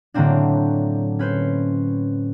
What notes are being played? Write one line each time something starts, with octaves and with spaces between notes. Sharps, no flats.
A2 D3 F#3 A#3 C4 D4
C#4 B4 C5